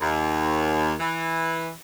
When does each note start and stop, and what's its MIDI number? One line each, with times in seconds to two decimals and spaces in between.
0.01 0.94 39
1.00 1.70 52